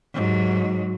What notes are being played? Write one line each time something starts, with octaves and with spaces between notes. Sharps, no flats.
G#2 F#3